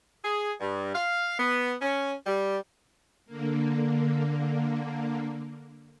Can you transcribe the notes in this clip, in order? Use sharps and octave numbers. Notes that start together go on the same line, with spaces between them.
G#4
G2
F5
B3
C#4
G3
D3 A#3